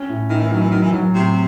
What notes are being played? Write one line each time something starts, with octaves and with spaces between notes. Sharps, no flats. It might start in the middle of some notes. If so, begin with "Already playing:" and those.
Already playing: C#4
A2
A2 D#3
E3
D#3 F#3
E3
D#3 F#3
E3
D#3 F#3
A2 C3